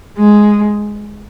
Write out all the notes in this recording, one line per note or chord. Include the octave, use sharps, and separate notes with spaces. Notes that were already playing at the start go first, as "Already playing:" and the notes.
G#3